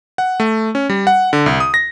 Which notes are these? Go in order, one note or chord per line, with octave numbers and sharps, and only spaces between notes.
F#5
A3
C#4
G3
F#5
D3
C2
D#6
A#6